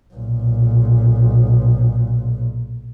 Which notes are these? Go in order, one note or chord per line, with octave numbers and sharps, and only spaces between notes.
B1 A#2